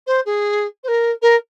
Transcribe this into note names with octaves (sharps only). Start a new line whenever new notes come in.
C5
G#4
C5
A#4
A#4